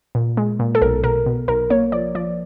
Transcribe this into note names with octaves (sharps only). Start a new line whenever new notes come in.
A#2
G#3
A#2
A4
B1 A#4
B2 A#4
B2
B1 A#4
A#3 C#5
F3 D5
F3 D5